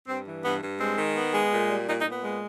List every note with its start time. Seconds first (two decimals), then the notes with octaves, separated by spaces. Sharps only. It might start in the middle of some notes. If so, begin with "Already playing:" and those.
0.08 G2 C4
0.26 E3
0.44 G2 B3
0.62 G2
0.80 G#3 C4
0.98 D#3
1.16 B3
1.34 G#3
1.52 A#2
1.70 G3
1.88 A#2 D#4
1.99 D#4
2.06 A#2
2.11 B3
2.23 G#3